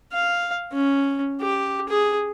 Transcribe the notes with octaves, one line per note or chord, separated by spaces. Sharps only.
F5
C#4
G4
G#4